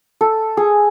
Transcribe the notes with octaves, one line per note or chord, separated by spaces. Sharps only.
A4
G#4